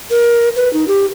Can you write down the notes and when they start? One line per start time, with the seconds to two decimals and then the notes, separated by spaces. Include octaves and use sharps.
0.11 A#4
0.56 B4
0.73 D#4
0.88 G4